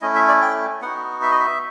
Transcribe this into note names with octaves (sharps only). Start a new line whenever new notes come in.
A3 C#4 E4 D#5
E5
D5
G5
B3 D#4 F#4 F#5
E5
D#5
E5